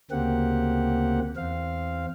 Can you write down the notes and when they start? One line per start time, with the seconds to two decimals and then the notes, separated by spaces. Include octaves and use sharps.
0.11 D2 C#3 A#3 C4 G4 F#5
1.37 E2 C4 F5